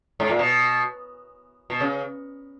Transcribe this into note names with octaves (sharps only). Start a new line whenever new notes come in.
G#2
A#2
B2
B2
C#3